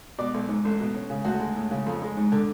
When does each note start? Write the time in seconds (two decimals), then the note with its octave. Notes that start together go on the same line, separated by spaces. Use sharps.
0.18 B2 D5
0.34 B1
0.48 G#2
0.65 A1
0.80 B2
0.95 C#4
1.10 C#3
1.25 D2 F#4
1.40 G#3
1.56 A2
1.71 C#3
1.87 F2
2.02 G#3
2.17 G#2
2.32 D3